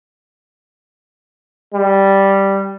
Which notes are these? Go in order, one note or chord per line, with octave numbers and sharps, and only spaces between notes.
G3